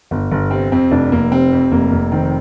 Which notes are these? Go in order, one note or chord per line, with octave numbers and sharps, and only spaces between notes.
G1
G1
C3 C4
F2 C4
F1 D4
F1 A#3
C3 C4
F2
F1 A#3
F1
D#3 C4